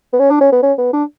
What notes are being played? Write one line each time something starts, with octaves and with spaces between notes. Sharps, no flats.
B3
C#4
D4
C#4
B3
C#4
B3
D4